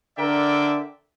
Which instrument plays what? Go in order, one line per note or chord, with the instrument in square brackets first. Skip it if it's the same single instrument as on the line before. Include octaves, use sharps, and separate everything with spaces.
[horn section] D3 A#4 D5 E5 G5